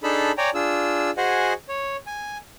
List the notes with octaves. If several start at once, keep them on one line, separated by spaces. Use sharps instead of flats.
D4 D#4 G#4 A4 A5 B5
C#5 D5 G5 G#5 A#5
D4 F4 G#4 E6
F#4 G#4 C5 D#5 F#5 G#5
C#5
G#5